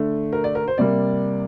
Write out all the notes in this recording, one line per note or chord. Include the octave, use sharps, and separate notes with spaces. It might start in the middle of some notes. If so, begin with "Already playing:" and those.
Already playing: D3 A3
A#4
D5
A#4
C5
C3 G3 A#3 D5